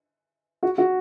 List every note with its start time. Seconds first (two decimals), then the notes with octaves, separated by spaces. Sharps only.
0.63 F#4
0.78 F#4